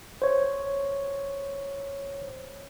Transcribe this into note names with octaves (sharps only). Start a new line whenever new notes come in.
C5 C#5